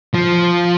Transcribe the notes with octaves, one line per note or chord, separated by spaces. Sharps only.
F3